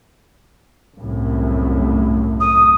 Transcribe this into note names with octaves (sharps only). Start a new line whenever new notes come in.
C2 F#2 A2
D#6